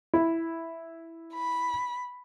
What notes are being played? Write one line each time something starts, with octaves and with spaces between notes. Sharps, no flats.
E4
B5